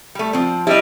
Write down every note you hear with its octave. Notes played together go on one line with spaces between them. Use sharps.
G3 A3
F3 C4
G3 E4 D#5